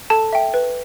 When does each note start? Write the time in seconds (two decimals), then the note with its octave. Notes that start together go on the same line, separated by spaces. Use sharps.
0.10 A4 A5
0.33 E5 G5
0.54 B4